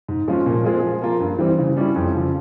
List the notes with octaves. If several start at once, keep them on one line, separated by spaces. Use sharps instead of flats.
G#2
F3 G#3 C#4 F4
A#2
G#3 C4 F4 G#4
F3
A#3 F4 A#4
G2
E3 G3 C4
C#3
G3 C#4 E4
F2
C#3 F3